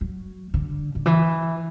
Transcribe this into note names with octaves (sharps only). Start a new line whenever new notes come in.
F#3
D3
D3
E3